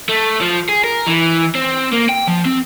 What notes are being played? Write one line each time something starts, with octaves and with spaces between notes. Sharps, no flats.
A3
F3
G#4
A#4
E3
C4
A#3
G5
F3
C4